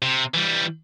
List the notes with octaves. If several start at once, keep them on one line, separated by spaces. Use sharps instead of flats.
C3
E3 G3